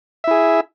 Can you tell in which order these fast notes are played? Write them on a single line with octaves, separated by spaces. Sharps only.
E5 E4 G#4